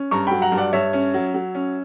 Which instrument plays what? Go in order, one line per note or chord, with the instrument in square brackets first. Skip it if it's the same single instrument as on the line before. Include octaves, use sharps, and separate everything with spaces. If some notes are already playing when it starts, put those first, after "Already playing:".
Already playing: [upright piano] C#4
G2 A#5 C#6
F#3 G5 B5
F#5 A#5
G2
D5 F#5
G2 C#5 E5
C#4
F#3
F#3
C#4